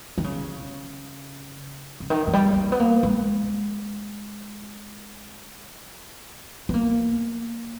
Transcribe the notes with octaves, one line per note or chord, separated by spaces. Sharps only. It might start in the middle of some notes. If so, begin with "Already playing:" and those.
D#3
C#3
C#3
D#3
E3
G3
A#3
B3
A#3
G#3
B3
A#3